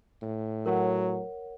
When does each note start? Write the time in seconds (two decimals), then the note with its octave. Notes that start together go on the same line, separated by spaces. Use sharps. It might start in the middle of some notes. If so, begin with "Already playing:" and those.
0.22 A2
0.66 F#3 A#4 C#5 F#5